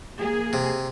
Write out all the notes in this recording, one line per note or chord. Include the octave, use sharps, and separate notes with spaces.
A#3 G#4
C3